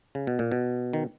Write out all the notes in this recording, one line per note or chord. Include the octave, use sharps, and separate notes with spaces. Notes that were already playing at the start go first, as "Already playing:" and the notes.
C#3
B2
A#2
B2
D#3